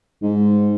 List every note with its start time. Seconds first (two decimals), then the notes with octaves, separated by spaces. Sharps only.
0.22 G#2